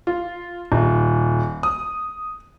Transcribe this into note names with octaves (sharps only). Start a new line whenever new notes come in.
F4
D#1
D#6